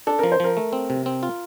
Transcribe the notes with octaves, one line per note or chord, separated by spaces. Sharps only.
D4 A4
F3 A#4
C5
F3 A#4
A3
C4
C3
C4
F4